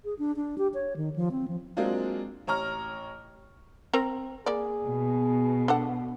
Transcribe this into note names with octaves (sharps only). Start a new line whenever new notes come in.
G#4
D4
D4
G4
C#5
D#3
F3
C4
F3
F#3 G#3 A#3 C4 D4 F4
A1 C#5 A#5 F6
C4 A#4 A#5
A#3 G#4 D5
B2
D4 A4 F#5